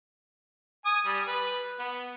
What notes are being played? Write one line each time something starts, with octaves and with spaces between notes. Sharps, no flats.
G#5 D#6
G3
B4
B3